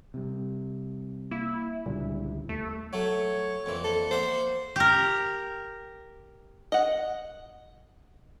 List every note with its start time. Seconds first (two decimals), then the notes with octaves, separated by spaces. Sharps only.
0.14 C3 G3
1.31 A#3 E4
1.86 C#2 A#2 D3 G3
2.49 D#2 A3
2.93 F#3 A3 C#5
3.66 F2 A#2 E3
3.84 A4
4.11 A#3 C5 E5 F#5
4.76 G4 A#4
6.72 D#5 F#5